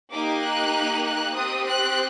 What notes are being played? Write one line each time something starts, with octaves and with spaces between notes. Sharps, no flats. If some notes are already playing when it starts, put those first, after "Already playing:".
A#3 D#4 G4 D6
F#6
F#6
C4 G4 D#6
F#6